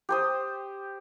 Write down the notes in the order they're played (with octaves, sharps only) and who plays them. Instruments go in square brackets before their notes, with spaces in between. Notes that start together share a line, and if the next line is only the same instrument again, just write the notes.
[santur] G4 C5 D#6